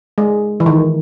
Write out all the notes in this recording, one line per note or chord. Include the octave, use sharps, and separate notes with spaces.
G#3
E3
D#3